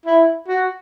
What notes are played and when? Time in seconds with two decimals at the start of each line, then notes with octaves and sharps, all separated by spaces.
0.06 E4
0.48 F#4